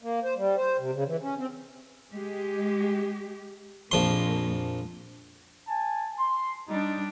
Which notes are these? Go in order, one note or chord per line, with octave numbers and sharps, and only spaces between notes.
A#3
C5
G3
C5
C3
C#3
E3
C#4
C4
G#3 G4
A#1 F2 F3 A#3 C6
G#5 A5
C6
G3 D4 D#4